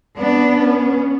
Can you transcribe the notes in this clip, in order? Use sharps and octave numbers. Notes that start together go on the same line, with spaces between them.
B3 D4
C#4